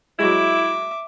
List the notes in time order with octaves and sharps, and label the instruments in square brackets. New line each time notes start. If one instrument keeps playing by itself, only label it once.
[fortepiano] F#3 G#3 [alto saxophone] E4 [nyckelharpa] E5 D6